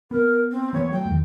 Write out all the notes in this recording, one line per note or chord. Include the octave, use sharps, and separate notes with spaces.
B3 A#4
C4
E3 A#3 B3 C#5
F#3 A3 G5
E2 D#3